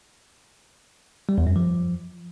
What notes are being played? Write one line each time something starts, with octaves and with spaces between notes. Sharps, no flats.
G3
E2
F#2
F3